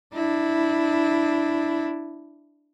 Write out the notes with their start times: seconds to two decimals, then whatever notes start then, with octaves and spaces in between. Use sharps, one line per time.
0.14 D4 E4